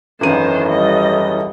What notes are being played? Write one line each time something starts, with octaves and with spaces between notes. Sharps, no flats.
G#1 F#2 A2 D#3 E3 C5 D#7
G3 D#5